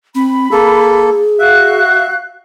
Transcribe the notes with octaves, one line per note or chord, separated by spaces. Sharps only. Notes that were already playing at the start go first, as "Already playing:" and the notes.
C4 B5
A#3 G#4 A4
F#4 E5 F5 F#6